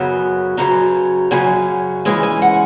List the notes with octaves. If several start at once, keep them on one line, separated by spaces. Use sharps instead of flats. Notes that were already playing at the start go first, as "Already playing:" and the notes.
Already playing: F#2 C#3 F#3 B3
F#2 C#3 F#3 A#5
F#2 C#3 F#3 G#5
C#3 E3 G#3 C#4 G#5
G#5
F#5